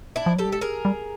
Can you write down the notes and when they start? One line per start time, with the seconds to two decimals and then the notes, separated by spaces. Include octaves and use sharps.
0.16 D4 E4
0.26 F3
0.36 F#3 G4 A4
0.45 G3
0.52 G#3 A4
0.61 G#4 A#4
0.85 G3